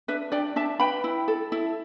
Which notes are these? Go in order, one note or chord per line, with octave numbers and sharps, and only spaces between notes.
D4 B4 E5
D4 D5 G5
D4 E5 A5
B4 G5 B5
E4
A4
E4